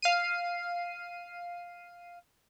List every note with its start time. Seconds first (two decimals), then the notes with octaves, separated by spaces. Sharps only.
0.02 F5 C7 D#7